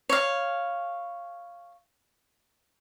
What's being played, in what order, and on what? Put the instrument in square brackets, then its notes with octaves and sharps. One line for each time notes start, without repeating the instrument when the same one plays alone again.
[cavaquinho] C#5 F5